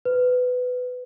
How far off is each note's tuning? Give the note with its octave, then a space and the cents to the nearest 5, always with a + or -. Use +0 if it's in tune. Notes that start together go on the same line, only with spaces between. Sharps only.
B4 +15